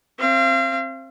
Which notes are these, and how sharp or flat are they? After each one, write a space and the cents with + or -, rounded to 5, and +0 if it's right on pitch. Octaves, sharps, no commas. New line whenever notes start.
C4 +20 F5 -35